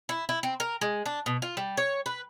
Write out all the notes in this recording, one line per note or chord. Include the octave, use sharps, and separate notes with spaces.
E4
E4
C4
A#4
G#3
D4
B2
F4
G3
C#5
B4